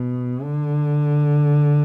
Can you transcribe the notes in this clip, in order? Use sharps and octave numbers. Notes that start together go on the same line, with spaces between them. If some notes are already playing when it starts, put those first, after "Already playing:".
Already playing: B2
D3